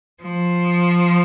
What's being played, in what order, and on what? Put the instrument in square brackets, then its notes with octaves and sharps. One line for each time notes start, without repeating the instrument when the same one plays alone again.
[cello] F3